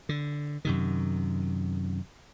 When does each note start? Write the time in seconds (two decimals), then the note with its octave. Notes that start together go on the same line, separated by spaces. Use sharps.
0.09 D3
0.65 F#2 C3 D#3